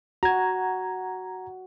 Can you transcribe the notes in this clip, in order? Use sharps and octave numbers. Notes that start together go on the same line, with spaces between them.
F#4 A#5 G#6